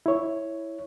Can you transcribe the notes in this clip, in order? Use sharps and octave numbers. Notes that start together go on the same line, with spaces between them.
E4 C#5